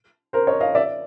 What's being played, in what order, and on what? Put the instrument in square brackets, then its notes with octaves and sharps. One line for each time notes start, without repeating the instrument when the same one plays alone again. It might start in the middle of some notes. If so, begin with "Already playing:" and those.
[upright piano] A#4 C5
C#5 D#5
D#5 F5
D5 E5